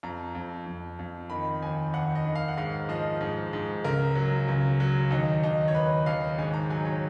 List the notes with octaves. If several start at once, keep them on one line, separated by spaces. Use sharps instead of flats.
F2 A#5
F2
F2
F2
D#3 B5
D#2 G#5
D#2 F#5
D#5
D#3
F5
F#5
G#2 F5
F3 D#5
G#2
G#2
C#2 A#4
F#3
C#2
F#3
D#2 D#4
D#2 D#4
C#5
D#2 B4
D#2 F5
G#2 G#5
A#5
F#3 G#5
C#5